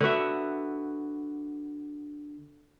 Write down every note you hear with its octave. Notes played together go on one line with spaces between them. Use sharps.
D3 B3 F#4 E5